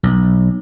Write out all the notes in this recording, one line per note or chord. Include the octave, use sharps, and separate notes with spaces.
B1